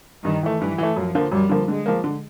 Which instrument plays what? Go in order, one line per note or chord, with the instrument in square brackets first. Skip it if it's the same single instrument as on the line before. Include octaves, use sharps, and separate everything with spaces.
[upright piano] G2 [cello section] D#3
[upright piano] E3 A3
[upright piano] G2 [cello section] E3
[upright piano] E3 A3
[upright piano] F#2 [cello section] F3
[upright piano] D3 F3 A#3
[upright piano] F#2 [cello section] G3
[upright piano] D3 F3 A#3
[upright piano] D3 [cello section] G#3
[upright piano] F3 A#3
D3